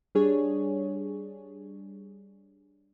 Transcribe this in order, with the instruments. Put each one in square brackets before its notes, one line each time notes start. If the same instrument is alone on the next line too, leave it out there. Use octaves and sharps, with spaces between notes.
[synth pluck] G3 D4 G#4 C#5